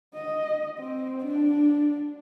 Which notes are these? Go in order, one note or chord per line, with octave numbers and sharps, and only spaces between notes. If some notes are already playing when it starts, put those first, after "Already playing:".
D#5
C4
D4